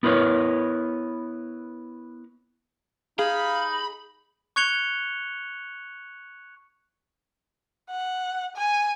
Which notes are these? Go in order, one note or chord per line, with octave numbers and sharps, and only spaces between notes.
B3 E4 A#4 B4 C#5
D#4 G#4 F5 B5
C#6 F#6 G#6 C#7 F7 G7
F#5
G#5